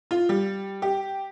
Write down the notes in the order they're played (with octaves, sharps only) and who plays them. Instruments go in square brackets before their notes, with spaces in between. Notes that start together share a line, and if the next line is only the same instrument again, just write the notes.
[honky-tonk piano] F4
G3
G4